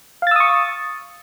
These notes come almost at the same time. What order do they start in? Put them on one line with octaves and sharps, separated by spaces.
F5 A6 E6 D#6 C#6